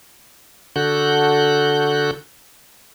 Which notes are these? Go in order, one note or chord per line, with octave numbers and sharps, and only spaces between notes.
D3 F#4 A4 F#6 G6